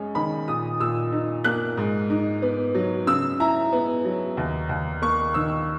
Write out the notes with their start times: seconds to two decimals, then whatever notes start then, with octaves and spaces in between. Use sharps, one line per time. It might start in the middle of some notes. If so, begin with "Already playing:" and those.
Already playing: F#2 G#3 C#4
0.15 D#3 B5
0.48 A#2 D#6
0.80 A#2 E6
1.12 D#4
1.44 A#3 F#6
1.77 G#2
2.10 D#4
2.42 B3
2.75 F#3
3.07 C#3 E6
3.40 E4 A#5
3.72 B3
4.05 F#3
4.37 D#2
4.69 D#2
5.02 A#3 C#6
5.34 D#3 E6